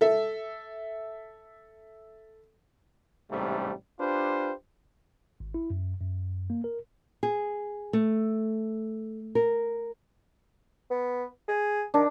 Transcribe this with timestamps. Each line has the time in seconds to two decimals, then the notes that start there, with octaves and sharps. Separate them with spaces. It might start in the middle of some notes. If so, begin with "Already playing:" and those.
0.01 A4 E5
3.30 A1 G#2 C3 G3 A3
4.00 D4 F4 G4 B4 C5
5.40 G#1
5.54 E4
5.70 F#2
6.01 F#2
6.50 A#3
6.64 A#4
7.23 G#4
7.93 A3
9.35 A#4
10.90 B3
11.48 G#4
11.94 D#3 D4